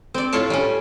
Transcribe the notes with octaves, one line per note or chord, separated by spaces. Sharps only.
C4 D5
A2 F4 C#5 A5
G3 C#4